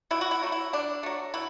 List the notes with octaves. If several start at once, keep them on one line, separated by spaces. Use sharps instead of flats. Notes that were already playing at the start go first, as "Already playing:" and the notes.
B2 E4
F#4
E4
F#3 A3
E4
B2 D4
F#3 A3
B2 E4